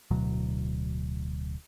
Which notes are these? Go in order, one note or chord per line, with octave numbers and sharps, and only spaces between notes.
D1 D2 B2 F#3